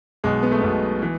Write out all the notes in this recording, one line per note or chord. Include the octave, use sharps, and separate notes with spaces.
B1 B2 G#3
B3
A3
B1 B2 B3
E3